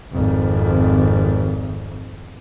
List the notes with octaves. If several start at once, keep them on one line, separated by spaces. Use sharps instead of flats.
G#1 F2